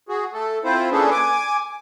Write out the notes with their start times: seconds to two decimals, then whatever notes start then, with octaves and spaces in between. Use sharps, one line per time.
0.09 F#4 G#4
0.33 A3 A4
0.64 C4 E4 F4 C5
0.92 A#3 C#4 D4 G#4 A4 B4
1.11 G#5 D6